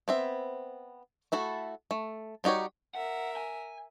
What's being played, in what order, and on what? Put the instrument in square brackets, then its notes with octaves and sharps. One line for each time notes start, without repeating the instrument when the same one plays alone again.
[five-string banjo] B3 C4 E5
A3 E4 F#4 A4
A3
G3 D#4 F#4 G4 C#5
[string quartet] A#4 E5 [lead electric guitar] F#5
[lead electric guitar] G#5